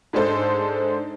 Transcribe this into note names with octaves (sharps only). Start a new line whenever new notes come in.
G#2 G#3 D4 A4 C5